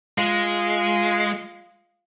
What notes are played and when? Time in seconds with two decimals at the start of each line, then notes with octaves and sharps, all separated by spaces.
0.18 G#3 F4